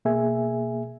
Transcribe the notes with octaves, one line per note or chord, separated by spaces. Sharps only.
B2 A#3 G#4 E5 G#5